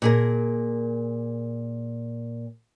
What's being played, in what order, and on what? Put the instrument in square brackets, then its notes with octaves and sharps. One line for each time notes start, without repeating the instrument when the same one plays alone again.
[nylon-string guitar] A#2 G#4 A#4